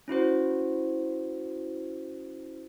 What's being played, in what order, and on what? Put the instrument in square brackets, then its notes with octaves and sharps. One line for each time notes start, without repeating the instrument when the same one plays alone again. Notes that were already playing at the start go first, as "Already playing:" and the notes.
[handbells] C#4 E4 F#4 C5